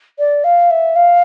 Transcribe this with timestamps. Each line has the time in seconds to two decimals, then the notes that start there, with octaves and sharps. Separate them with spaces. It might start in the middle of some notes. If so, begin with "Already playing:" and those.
0.19 D5
0.44 F5
0.71 E5
0.96 F5